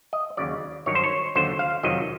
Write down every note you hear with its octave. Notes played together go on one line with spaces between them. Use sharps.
D#5
D#2 C#3 F#3 D5
G2 D#3 F#3 C#5
C5
C#5
D#2 D3 F#3 C5
F5
F2 C3 D#3 F#3 D#5